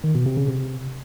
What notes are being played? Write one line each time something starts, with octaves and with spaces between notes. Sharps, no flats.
D#3
B2
C3
C#3
C3